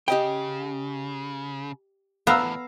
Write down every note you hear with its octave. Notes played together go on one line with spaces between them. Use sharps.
C#3 G4 D#5 G5
E2 A2 B3 F5 A#5 E6